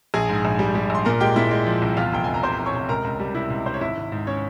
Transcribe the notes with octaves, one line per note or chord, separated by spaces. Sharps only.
A#1 G#4 G#5
G#2
A#1
G3
G3
A#1 C6
A#2 A#4 A#5
G#3 G4 G5
A#2 E4 E5
G#3
F3
C2
E2 F4 F5
F1 G5
F1 G#5
A#5
C3 C5 C6
F1
C#5 C#6
C3
C#2 A#4 A#5
C#2
G3
C3 E4 E5
C#2
C3 C5
C#5
G#1 E4 E5
G#1
G#2
C#4 C#5